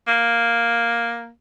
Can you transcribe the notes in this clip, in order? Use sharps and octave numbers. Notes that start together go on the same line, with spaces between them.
A#3